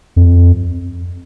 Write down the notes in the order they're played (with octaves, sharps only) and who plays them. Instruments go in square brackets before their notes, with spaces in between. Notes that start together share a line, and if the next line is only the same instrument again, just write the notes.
[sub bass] F2